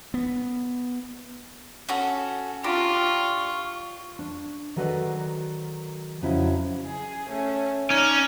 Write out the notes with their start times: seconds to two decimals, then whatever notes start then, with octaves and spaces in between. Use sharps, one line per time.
0.14 B3
1.89 C#4 F#4 A4
2.64 D4 F4 G4 A#5 C#6
4.19 D4
4.76 D#3 F#3 G#4 A4 B4 D5
6.21 F2 C#3 F#3 C#4 D#4 E4
6.85 G#4
7.28 A3 C#4
7.90 C#4 D#4 D5